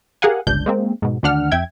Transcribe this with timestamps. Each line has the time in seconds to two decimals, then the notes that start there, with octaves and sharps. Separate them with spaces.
0.22 G4 G#4 A#4 F5 F#5 G#5
0.47 G1 C#2 D4 G6
0.66 G#3 A#3 C4
1.02 G#2 B2
1.23 D2 D#3 D4 F#5 F6
1.51 F2 E5 G5 G#6